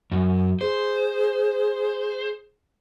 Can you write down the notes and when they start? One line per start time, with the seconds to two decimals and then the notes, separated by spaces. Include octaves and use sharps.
0.12 F#2
0.61 G#4 C5